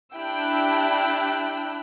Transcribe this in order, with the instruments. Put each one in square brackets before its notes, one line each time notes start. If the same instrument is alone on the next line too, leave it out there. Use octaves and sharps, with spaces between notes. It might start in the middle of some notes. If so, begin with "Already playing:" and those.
[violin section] D4 E4 G4 G5 E6 F#6